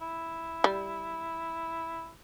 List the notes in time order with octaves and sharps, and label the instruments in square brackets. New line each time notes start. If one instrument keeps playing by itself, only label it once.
[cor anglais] E4
[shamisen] G3